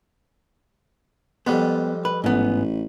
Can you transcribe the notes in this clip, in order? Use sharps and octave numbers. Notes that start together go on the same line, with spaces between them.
F2 G3 G#3 B3
B4
A1 G#2 B3